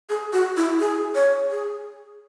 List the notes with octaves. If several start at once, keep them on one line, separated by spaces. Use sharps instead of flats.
G#4
F#4
E4
G#4
C#5
G#4